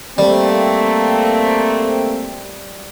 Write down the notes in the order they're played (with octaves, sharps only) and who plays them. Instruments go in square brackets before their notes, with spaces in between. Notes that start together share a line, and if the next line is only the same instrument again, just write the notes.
[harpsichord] G3 [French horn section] A3 A#3 C4